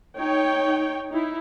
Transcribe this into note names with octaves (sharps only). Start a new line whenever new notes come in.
D#4 C#5 G5
D#4 E4